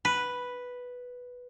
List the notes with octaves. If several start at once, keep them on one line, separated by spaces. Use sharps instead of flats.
B4